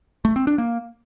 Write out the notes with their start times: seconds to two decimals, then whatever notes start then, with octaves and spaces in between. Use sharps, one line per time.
0.25 A3
0.36 C4
0.47 D4
0.58 A#3